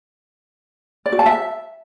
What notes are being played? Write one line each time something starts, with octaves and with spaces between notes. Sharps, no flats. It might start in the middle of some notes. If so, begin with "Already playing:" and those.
D5
F#4
A5
E5